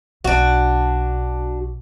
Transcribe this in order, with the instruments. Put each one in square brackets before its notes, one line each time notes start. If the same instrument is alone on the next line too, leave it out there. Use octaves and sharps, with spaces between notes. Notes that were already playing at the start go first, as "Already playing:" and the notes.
[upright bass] B1 [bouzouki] D4 F#4